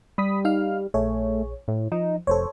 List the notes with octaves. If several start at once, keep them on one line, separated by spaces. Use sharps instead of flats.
G3 B5 D#6 B6
D#4 F5 F6
A#1 A3 G#4 C#5
A2
F3 D#4
F1 A4 C5 C#5